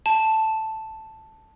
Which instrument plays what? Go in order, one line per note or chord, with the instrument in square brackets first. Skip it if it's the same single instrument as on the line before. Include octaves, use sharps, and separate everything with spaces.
[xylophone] A5